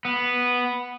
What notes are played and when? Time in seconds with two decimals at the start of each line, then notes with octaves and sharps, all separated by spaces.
0.05 B3